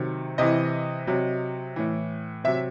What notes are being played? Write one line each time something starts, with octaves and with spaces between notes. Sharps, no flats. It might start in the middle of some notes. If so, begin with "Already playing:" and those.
Already playing: C3 D#3 F#3
C3 E3 D#5
C3 F#3
A2 E3
C3 F#3 E5